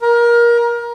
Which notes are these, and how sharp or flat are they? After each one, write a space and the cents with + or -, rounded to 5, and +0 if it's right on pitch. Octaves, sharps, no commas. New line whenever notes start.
A#4 +25